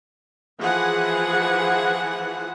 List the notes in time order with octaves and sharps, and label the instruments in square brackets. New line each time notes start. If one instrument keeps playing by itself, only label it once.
[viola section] E3 F3 G#4 F#5